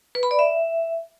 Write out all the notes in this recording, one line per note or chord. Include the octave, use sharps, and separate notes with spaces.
B4
B5
D5
E5